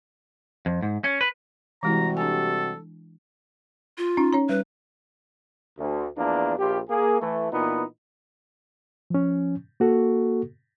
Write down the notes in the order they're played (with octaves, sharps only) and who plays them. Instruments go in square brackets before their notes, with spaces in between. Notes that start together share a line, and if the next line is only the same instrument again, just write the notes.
[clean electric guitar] F2
G#2
C#4
B4
[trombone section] C3 G3 F#4 [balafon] E3 G#3 E4 [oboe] A#5
[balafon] D4 G#5 [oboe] A4
[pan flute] F4
[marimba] C#4 D#4
C#4 C#5 A#5
[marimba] G3 [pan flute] B4
[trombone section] D2
E2 F3 A#3 D4
A#1 F4 G4
A#3 G#4
E3 A3
A#2 E3 B3 D#4 E4
[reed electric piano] F3 C#4
A#3 F#4 A4